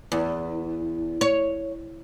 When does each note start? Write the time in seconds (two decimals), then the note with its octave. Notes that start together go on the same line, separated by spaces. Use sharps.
0.12 E2
1.21 C#5